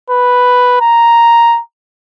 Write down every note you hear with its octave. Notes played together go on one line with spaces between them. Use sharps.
B4
A#5